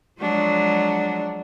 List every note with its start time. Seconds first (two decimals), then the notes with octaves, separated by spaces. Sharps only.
0.21 F3 F#3 G#3 D4